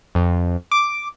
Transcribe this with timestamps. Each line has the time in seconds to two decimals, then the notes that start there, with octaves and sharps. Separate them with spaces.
0.15 F2
0.72 D6